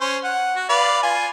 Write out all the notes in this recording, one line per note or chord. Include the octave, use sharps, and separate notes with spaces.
C#4 C5
F#5
F#4
B4 D5 F5
F4 G#5